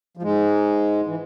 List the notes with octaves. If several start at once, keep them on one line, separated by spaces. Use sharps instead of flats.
F3
G#2 G#3
E3